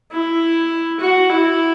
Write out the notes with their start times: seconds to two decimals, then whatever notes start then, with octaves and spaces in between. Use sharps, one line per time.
0.12 E4
1.00 F#4
1.29 E4